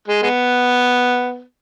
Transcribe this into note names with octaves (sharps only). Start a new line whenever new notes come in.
G#3
G#3 B3